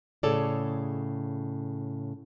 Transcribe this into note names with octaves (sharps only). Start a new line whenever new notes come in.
A2 C#3 G#4 A4 C#5 D5